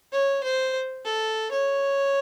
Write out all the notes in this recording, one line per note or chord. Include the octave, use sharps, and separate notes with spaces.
C#5
C5
A4
C#5